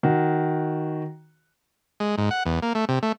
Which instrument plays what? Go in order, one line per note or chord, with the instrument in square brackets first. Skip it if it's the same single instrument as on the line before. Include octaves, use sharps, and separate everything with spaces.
[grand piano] D#3 F#4
[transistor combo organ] G#3
G#2
F#5
E2
A#3
A3
C3
A3